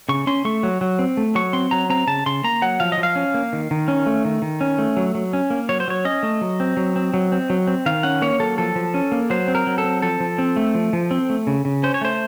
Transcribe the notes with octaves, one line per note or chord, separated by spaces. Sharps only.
C#3 C#6
C#4 C6
A3 C#6
F#3
F#3
C4
A3
F#3 C#6
C4 C6
F#3 A#5
C4 A#5
C#3 A5
C#3 C6
A#3 A#5
F#3 F#5
F3 F5
D#5
F3
F5
C#4
A#3
D#3
D#3
C#4
A3
D#3
D#3
C#4
A3
F#3
F#3
C#4
A#3
F#3 C#5
C5
F#3 C#5
C#4 D#5
A3
F#3
C4
F#3
C4
F#3
C4
F#3
C4
D#3 F5
C#4 F#5
A#3 C#5
F#3 A4
F3 A4
F3
C#4
A#3
F#3 C5
C4
A#4
F#3
A4
C4
F3 A4
F3
C4
A3
F3
F3
C4
A3
C#3
C#3
C#4 C5
C#5
A3 C5